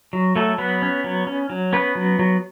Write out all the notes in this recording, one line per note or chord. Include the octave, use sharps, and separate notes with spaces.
F#3
F#3 A3 A4
F#3 B3 B4
C#4
F#3
C#4
F#3
B3 C#4 B4
F#3
F#3